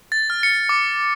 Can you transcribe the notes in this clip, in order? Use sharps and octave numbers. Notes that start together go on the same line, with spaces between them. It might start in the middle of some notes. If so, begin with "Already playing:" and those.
A6
F6
C#7
D6